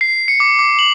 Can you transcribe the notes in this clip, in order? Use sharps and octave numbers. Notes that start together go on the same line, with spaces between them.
C7
C#7
D6
D6
F#7